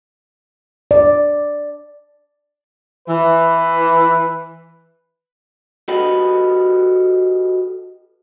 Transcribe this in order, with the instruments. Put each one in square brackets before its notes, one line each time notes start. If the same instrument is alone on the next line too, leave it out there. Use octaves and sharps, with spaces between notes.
[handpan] D5
[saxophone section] E3 [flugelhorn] B4
[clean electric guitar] F#4 G4 A4 B4 D#5 G5